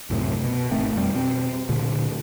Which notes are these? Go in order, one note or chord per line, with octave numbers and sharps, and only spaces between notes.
C2 F#2 A2 C3
B2
G#1 D#3 A3 C4
F2 B2 G3 C4
B2 C4
D2 A#2 D3